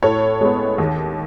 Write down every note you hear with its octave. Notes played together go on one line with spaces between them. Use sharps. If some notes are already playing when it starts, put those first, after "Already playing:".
A2 A4 C#5
G#3 B3
D#2